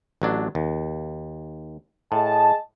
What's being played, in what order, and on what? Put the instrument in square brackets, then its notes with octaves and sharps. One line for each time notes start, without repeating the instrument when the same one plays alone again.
[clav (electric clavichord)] A1 F#3 D4
D#2
[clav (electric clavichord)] A2 [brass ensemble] G#4 D#5 A5